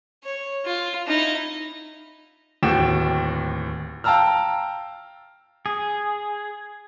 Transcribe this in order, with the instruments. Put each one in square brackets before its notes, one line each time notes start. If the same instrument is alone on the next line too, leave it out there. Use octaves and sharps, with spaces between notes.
[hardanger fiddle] C#5
F4
D#4 E4
[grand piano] D1 D#2 F#4 G5 E7
F5 G5 A5 A#5 E6 F6
[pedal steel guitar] G#4